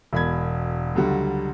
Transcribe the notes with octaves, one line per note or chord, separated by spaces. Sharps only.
E1 B5 G#6
C#2 D3 F#3 G3